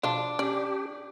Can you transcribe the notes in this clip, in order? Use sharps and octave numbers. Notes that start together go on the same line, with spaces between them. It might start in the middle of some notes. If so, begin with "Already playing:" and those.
B2 F3 D4 F4
C#4 G4 D5